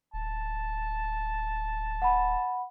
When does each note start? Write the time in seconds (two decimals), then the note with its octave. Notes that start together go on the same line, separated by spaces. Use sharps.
0.14 D1 A5
2.02 F#5 B5